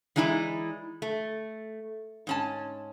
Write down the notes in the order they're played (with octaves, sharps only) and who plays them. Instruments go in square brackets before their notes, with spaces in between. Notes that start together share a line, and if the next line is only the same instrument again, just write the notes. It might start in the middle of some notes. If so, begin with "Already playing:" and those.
[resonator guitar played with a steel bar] E3 G#3 D#4 E4 G#4 D5
A3
G#2 C#4 A5